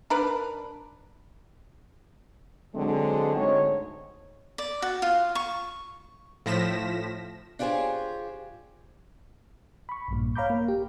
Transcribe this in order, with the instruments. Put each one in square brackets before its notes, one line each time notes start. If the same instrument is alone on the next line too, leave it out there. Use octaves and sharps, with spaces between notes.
[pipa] D4 A#4 B4
[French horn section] D3 F#3 G#3 C4
D2 G#2 D#4 C#5
[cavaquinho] D5
F#4
F4
C#6
[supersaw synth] A2 F3 A#6 B6 E7
[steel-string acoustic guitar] D4 F4 G4 G#4 C5 C#5
[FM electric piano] B5 C#6
A#1 G2 A#2
C#5 F5 A#5 B5 D6 G6
A#3
G4